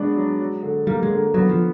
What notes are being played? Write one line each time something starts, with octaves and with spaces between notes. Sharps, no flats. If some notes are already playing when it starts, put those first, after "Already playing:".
Already playing: G#3 B3 D4 F#4
F#3
F#3
D3
G3 A#3
G#3
D3
F#3 B3
F3